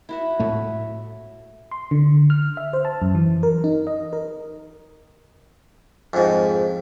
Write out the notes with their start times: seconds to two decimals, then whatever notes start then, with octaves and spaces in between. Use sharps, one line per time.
0.09 E4 F#4 E5
0.39 A2 A3
1.71 C6
1.91 D3
2.30 F6
2.57 E5
2.73 C5
2.85 A5
3.02 F#2
3.15 E3
3.43 A#4
3.64 D#4
3.87 D#5
4.13 A#4
6.13 F2 G#2